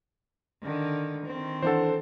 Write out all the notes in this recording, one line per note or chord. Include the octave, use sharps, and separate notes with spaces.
D3 D#3
D#3 C4
E3 D4 A4 C5 F#5